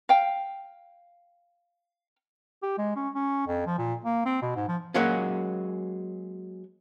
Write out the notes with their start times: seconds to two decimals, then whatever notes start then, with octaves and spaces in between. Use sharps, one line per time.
0.09 F5 G5
2.62 G4
2.78 G#3
2.96 C#4
3.14 C#4
3.47 F2
3.67 F3
3.78 A#2
4.04 A#3
4.26 C4
4.42 B2
4.56 G#2
4.68 F3
4.94 F#3 G#3 A#3 C#4